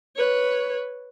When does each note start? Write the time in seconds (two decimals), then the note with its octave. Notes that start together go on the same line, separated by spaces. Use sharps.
0.16 B4 C#5